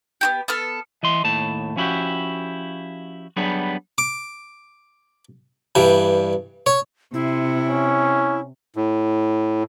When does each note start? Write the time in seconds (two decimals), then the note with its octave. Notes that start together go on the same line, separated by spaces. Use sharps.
0.21 B3 F#4 G4
0.48 B3 A4 F6
1.03 E3 D#5 C6
1.24 D#2 A2 A5
1.76 F3 C#4 E4 F#4 G4
3.36 F#3 G3 B3 D4 G#4
3.98 D6
5.75 G2 E3 G3
6.66 C#5
7.14 C3 E4
7.69 C#4
8.76 A2